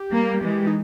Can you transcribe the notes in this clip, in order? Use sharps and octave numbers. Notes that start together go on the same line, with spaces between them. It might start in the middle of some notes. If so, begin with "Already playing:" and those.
Already playing: G4
G3 A#3
E3 G#3
D#4